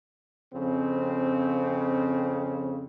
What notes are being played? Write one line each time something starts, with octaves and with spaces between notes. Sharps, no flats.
F2 C#3 C4